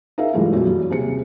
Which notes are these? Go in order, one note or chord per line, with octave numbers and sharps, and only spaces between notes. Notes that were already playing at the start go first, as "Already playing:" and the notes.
D#4 G#4 A#4 E5 F5
G2 E3 F#3 G#3 A3 F4
B1 F#2
G3
D#1 C3 G#4 C#7